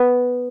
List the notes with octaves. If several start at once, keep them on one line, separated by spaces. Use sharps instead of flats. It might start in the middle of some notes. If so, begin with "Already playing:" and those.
Already playing: B3